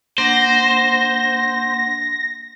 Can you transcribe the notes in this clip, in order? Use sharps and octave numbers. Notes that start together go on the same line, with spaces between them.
A#3 D4 C5 F#5 A#6